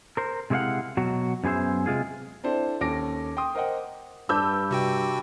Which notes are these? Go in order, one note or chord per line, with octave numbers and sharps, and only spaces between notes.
A#4 C5
C3 G#3 E4 C#5 F5 F#5
B2 F#3 F#4
F#2 B3 G#4 C5 E5
C3 G#3 F4 G#4
C4 D4 E4 A4 C5
D#2 C#4 A4 D6 A#6 D7
G5 C6 D#6
A#4 C5 D#5 F#5 G5
G2 D4 B4 D5 E6 G6
C3 F#4 G5